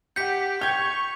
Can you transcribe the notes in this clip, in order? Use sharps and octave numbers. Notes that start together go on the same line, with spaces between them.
G4 F#5 G6 B6 C#7
G5 C#6 G6 G#6 F7